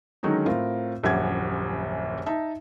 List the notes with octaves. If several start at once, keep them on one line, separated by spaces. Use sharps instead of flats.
D3 D#3 F#3 G#3 C#4 D#4
A2 C4 F4 A#4
D#1 A#1 F#2 G4 F#5 G#6
D#4 E5 A5